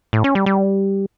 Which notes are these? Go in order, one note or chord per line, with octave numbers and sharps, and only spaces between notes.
A2
C#4
G3
G3